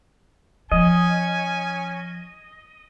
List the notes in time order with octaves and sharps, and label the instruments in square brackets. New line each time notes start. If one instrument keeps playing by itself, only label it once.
[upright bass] F3 [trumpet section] C#4 G#5 [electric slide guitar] D#5